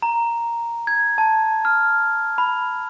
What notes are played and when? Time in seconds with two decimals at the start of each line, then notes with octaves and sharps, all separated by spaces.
0.02 A#5
0.87 G#6
1.18 A5
1.65 F6
2.38 B5